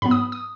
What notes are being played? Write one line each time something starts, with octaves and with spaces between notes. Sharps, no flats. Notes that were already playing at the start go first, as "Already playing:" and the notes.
G#2 F#3 B3 B5
D#6
D#6